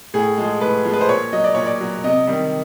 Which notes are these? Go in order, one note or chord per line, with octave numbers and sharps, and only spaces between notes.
A2 G#4
F3 G#3
A2 B4
F3 G#3
B4
C5
A#2 C#5
F#3 D#5
D5
A#2 C#5
D5
F#3
C3 D#5
D#3 G3